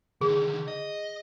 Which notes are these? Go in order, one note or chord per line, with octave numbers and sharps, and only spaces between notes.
D3 D#3 G#4
D#5